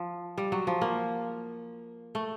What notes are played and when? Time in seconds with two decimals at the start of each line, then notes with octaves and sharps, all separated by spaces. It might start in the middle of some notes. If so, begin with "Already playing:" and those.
Already playing: F3
0.38 G3
0.52 F#3
0.67 F3
0.82 A#3
2.15 A3